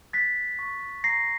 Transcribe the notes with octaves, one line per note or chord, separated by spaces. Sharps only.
F#6 A6 B6
C#6
A#5 A#6 C7